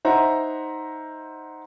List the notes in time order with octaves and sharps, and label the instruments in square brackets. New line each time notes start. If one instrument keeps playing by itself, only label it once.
[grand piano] D#4 C5 E5 F#5 A#5 C6